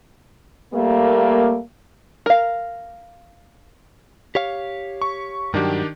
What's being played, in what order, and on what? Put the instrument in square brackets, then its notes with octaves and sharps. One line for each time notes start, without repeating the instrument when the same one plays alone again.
[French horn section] G3 A3 A#3
[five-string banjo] A#4 F5
[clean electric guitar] G4 C#5 F5
[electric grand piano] C#6
[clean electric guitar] G2 F#3 [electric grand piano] D#3 D4 G4